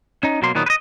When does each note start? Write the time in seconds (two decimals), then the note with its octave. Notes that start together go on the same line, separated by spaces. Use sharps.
0.23 C#4 D#4
0.42 B2 F#3 A#3 C6
0.55 A#2 D#3 F#3 B3
0.66 B4 D#5